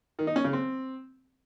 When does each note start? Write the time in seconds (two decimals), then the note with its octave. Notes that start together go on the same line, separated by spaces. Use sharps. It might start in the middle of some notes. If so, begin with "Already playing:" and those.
0.19 D#3
0.27 D#4
0.36 C#4
0.44 C#3
0.53 C4